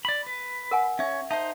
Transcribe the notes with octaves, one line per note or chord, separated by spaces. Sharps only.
D5 B5
B4
A#4 F#5 G#5
C#4 C#5 E5
D#4 C5 E5 A5